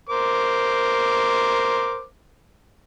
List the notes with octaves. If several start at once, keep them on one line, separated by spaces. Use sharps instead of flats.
A#4 C5 D6